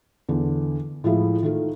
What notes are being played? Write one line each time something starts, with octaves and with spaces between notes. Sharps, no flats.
E2 D3
A2 F3 G#3 E4
D#3 A3 F4